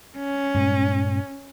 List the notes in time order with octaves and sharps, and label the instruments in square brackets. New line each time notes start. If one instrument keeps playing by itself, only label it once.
[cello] C#4
[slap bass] G2 A#2 G#3